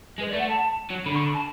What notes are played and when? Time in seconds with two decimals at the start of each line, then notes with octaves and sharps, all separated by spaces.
0.19 G#3 B4
0.29 D5
0.34 A3
0.39 F#5
0.48 A5
0.91 F#3
1.05 D3 B5
1.14 C#6
1.25 B5
1.34 A5